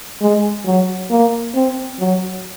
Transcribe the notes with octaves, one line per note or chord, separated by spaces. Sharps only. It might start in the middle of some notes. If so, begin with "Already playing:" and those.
G#3
F#3
A#3
C4
F#3